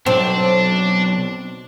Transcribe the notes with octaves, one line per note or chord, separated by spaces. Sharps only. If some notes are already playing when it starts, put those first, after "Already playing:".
B1 C4 D4